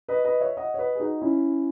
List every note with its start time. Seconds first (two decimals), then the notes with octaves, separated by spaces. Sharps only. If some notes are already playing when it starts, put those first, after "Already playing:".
0.08 B4 D#5
0.25 B4 D#5
0.41 C#5 E5
0.57 D#5 F#5
0.74 C#5
0.79 B4 D#5
0.95 G#4
1.00 D#4 F#4
1.21 C#4 E4